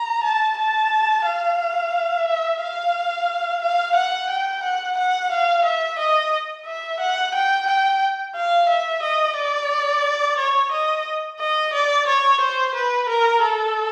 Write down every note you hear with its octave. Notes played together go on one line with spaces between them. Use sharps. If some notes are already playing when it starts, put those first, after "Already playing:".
Already playing: A#5
A5
A5
F5
E5
F5
F5
F#5
G5
F#5
F#5
F5
E5
D#5
E5
F#5
G5
G5
F5
E5
D#5
D5
C#5
D#5
D#5
D5
C#5
C5
B4
A#4
A4